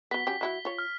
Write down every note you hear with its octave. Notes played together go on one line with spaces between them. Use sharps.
F#3 B3 B6 G7
F#3 C#4 G4
F#3 E4 F#4
F4 C#5
F6